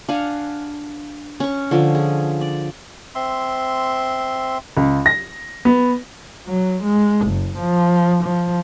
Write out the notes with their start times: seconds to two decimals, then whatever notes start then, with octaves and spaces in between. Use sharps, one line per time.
0.09 D4 F5 F#5 G#5
1.40 C#4 C#6
1.71 D3 F3 C#4
1.95 G#4
2.41 D5
3.15 C4 E5 C6
4.77 C#2
5.06 A#6
5.65 B3
6.47 F#3
6.83 G#3
7.26 F#1
7.57 F3
8.23 F3